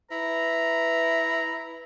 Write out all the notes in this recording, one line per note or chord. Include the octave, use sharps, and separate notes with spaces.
E4 B4 A#5